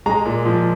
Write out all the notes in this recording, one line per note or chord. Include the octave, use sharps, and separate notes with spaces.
G#3 A#5
A#2
F3